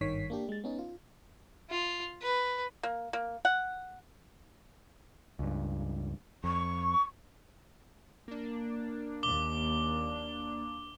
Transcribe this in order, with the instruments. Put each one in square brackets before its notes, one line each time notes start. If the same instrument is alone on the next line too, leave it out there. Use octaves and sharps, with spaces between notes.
[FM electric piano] G#1 G2 D#3 C#5 B6 C7
A#3 D4 G4
G#3 A6
B3 C#4 D#4
F4
[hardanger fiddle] F4
B4
[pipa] A#3
A#3
F#5
[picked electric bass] C#2 G2
[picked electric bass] F2 [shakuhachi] C#6
[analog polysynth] A#3 D4
[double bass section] D#2 [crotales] D6 G7